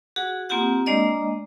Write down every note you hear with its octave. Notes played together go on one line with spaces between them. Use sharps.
F#4 G#4 F#5
A#3 C4 F4 G4 F#5
G#3 A#3 D4 D5 D#5